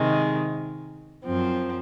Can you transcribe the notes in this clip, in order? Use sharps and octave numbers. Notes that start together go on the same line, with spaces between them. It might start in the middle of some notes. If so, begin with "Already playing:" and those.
Already playing: C3 D#3 G#3
F#2 F3 C4